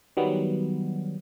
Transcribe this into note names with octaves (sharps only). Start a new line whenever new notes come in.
D#3 F#3 G3 B3